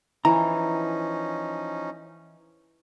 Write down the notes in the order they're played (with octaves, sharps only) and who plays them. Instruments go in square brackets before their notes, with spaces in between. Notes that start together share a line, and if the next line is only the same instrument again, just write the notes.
[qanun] E3 [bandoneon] F3 C#4 D#4 [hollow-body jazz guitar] A#5